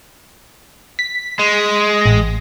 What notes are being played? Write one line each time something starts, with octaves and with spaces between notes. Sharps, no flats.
B6
G#3
A1 A#6